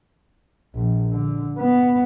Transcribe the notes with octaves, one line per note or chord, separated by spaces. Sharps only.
A#1
D3
B3